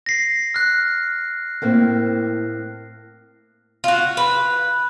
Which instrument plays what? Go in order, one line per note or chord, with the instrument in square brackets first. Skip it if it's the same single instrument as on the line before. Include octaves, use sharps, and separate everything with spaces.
[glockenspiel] A#6 C7
F6 F#6
[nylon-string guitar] A2 A#3 C4
[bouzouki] F4 F#4
B4